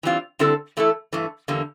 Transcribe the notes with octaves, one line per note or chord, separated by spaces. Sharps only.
E3 G3 C4 F4
D3 G3 C4 E4 A4
E3 A3 E4 A4
G2 E3 A3
E2 D3 G3 A#3